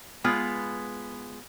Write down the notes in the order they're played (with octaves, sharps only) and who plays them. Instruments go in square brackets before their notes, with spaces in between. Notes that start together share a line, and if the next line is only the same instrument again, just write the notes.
[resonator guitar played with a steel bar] G#3 B3 F4